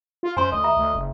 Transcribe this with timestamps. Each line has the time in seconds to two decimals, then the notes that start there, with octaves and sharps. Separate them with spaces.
0.23 F4
0.37 F#2 C5 G#5 C6
0.52 D2 D#5
0.64 E5 A#5
0.77 D2
0.94 F#1